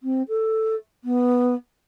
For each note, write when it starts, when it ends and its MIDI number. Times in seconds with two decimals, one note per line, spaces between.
0.03 0.22 60
0.28 0.75 69
1.04 1.54 59